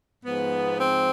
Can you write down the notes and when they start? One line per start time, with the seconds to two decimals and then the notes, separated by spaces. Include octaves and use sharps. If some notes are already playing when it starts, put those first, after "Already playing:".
0.23 G#2 F3 B3
0.79 C4